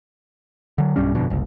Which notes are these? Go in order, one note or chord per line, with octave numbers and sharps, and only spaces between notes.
D3 F#3
B1 G2 G3 C#4
G1 F2 B2 D3
F#1 C2